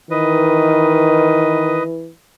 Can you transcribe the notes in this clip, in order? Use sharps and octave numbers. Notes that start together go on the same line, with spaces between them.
D#3 E3 B4 D#5